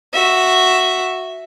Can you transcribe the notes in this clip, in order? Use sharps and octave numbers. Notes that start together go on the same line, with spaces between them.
F#4 E5